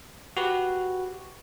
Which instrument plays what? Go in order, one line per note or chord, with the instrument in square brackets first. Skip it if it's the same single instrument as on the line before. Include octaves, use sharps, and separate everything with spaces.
[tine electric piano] F#4 G4 B4